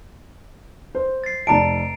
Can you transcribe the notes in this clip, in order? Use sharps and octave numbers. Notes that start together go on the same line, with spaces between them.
C5
A6 C7
F1 D5 A5 A#5 D7